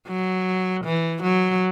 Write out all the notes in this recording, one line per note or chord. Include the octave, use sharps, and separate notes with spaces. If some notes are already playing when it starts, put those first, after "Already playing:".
F#3
E3
F#3